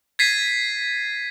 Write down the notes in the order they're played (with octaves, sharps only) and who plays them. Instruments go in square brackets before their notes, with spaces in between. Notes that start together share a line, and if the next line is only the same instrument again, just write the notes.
[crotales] G#6 A6 B6 C7 D#7